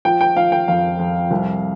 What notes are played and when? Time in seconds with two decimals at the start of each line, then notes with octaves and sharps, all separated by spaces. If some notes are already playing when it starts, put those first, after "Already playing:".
0.05 F3 G5
0.21 G5
0.37 F3 F5
0.52 G5
0.68 F2 F5
0.99 F2
1.31 C2